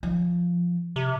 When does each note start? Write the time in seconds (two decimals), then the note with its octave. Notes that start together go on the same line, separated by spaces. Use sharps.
0.03 F3
0.96 C3